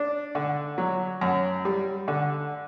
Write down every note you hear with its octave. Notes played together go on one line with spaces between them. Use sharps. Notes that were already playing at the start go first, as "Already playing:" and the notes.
Already playing: D4
D3
F#3
F#2
G3
D3